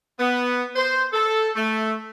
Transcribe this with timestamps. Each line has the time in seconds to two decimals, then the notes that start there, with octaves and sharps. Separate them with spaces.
0.19 B3
0.76 C5
1.13 A4
1.56 A3